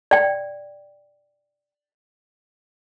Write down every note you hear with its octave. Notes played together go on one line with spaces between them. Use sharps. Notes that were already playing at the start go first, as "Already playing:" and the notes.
D5 G5